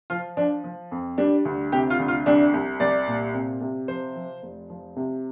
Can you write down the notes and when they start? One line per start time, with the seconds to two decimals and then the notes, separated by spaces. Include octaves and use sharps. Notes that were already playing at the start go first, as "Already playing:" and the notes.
0.10 F3 F4
0.37 F3 D4
0.64 F3
0.91 F2
1.18 G3 D4
1.45 D2
1.72 C3 G4
1.90 F4
1.99 D2
2.08 F4
2.26 C2 D4
2.54 C2
2.80 C2 D5
3.07 A#2
3.34 C3
3.61 C3
3.88 F3 C5
4.15 F3
4.43 F1
4.70 F3
4.96 C3